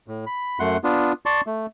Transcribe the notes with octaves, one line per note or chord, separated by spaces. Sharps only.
A2
B5
F#2 A3 F#5 C6
B3 D4 F4
D5 A5 C6 C#6
A3